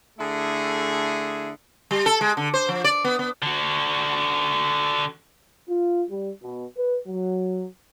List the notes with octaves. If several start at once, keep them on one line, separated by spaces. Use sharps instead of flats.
D3 A3 E4 G#4
G3
A4
G#3
D3
C5
F3
D5
B3
B3
D3 F#4
F4
G3
B2
B4
F#3